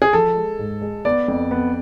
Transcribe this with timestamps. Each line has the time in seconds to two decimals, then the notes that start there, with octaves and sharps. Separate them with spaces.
0.02 G#4
0.13 F3 A4
0.36 G#3
0.59 G#2
0.82 G#3
1.05 B3 D5
1.28 F2
1.51 B3